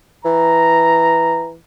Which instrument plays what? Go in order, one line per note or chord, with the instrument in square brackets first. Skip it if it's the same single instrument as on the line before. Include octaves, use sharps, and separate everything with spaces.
[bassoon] E3 [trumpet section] A#5